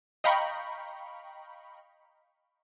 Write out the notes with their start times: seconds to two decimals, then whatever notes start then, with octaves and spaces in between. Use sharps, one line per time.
0.24 D#5 F5 G5 A#5 B5 C#6